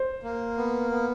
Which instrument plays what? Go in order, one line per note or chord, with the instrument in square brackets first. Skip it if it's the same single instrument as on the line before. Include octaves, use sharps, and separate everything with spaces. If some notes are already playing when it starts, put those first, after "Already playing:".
Already playing: [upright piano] C5
[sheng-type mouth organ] A#3
B3
B3